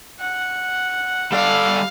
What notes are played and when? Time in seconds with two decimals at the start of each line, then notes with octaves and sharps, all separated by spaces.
0.21 F#5
1.32 G3 A4 D5 F5